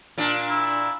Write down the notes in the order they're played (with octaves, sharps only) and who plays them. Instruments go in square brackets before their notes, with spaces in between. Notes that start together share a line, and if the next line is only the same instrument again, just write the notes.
[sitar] A#2 D4
[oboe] E4